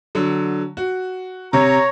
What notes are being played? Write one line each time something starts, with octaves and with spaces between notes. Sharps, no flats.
D3 F#3
F#4
C3 C#5 A#5